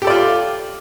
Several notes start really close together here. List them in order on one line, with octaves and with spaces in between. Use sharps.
G4 A4 D5 F4